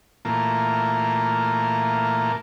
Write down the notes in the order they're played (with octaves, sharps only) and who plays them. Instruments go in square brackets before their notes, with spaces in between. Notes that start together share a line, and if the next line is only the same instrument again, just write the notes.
[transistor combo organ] A#2 E3 A3 A#3 F4